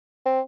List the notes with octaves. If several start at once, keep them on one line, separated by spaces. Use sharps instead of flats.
C4